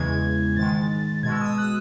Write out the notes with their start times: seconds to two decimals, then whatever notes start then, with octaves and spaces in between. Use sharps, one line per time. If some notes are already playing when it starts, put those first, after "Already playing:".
Already playing: E2 C#3 E3 G#3 G#6
0.56 G#2 D#3 G#3 A6
1.23 B2 G#3 G#6
1.32 E6
1.41 D#6
1.50 E6
1.58 F#6